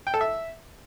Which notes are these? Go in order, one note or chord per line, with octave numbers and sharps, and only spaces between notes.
G5
A4
E5